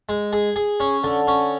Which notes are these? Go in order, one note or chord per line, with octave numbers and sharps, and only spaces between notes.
G#3
G#4
G#4
C#4
D3
C#4